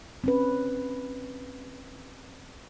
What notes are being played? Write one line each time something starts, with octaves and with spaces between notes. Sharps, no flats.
C4 C#4 B4